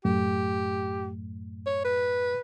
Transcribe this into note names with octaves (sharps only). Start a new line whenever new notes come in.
F#2 A2 A3 G4
C#5
B4